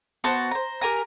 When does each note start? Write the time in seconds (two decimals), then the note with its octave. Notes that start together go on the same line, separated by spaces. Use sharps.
0.24 B3 F#4 C5 A5
0.51 C5 A#5
0.81 G4 A#4 G#5 A#5